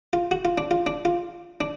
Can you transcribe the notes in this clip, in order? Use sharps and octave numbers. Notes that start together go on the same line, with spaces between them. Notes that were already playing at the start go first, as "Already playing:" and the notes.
F4
F#4
F4
D4
F4
D4
F4
D4